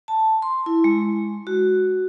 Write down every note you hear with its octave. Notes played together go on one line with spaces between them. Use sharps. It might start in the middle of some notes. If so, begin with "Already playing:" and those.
A5
C6
E4
G#3
F#4